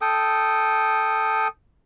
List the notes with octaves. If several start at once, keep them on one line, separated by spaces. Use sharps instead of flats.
A4 G5 D#6